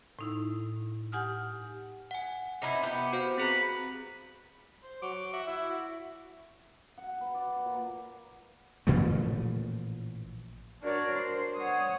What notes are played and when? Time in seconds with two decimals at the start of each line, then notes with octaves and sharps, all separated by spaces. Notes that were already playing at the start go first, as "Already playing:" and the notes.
0.19 A2 D#4 E4
1.12 G4 F#5 G#5 D#6 F6
2.11 F#5 G#5
2.62 C3 D#4 E4
2.83 B3 G4
3.13 F#4 C5 F5
3.38 C4 G#4 B4 A#5 B5
4.84 C5
5.02 F#3 D6
5.33 F#4 E5
5.47 E4
5.70 F#4
6.98 F#5
7.21 B4
7.35 D5
7.47 D5
7.65 A#2
8.87 A1 A#2 F3 A3
10.82 D4 F#4 A#4 C#5 D5
11.13 C5
11.56 C#5 F#5 D#6